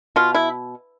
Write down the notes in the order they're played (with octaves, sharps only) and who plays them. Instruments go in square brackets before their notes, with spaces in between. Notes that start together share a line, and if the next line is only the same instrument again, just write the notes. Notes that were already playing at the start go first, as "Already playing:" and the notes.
[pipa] B2 F4
E4